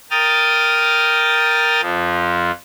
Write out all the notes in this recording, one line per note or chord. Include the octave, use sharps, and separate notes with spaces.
A#4 G5 D#6 F6 A6
F2 F3